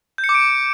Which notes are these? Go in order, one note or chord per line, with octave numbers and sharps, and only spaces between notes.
G6
C#7
D6
D7